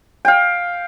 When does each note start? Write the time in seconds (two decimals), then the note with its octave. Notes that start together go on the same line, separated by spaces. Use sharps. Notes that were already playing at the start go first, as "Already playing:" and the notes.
0.25 F5 G5